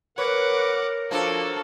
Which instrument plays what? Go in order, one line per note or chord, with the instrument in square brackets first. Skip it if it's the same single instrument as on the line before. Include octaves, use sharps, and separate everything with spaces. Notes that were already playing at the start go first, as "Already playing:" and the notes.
[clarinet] A#4 [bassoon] B4 [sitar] C#5 [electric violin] F#5 D6
[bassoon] F3 [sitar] A#3 D4 [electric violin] F#4 A4